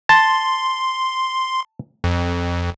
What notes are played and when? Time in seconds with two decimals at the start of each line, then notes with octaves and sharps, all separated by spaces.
0.09 A5 C6
2.04 F2